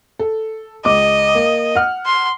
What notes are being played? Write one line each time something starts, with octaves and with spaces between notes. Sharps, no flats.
A4
C#2 D#5 D6
A#3
F#5 F6
C6